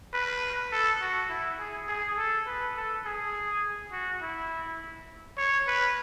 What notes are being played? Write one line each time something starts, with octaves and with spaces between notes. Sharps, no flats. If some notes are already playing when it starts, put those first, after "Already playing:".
B4
A4
F#4
E4
G#4
G#4
A4
B4
A4
G#4
F#4
E4
C#5
B4